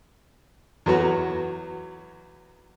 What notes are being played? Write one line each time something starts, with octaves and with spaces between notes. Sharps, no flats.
E2 F#3 B3 F#4 A#5